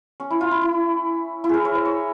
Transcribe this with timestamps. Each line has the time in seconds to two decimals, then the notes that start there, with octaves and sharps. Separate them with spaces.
0.20 C#4
0.31 E4
0.41 F4
0.51 E4
0.61 E4
1.44 E4
1.49 G#4 A#4
1.65 C#5
1.75 C5
1.85 C#5